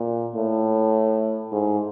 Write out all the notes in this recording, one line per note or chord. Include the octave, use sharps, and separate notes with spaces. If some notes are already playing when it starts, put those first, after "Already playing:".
Already playing: A#2
A2
G#2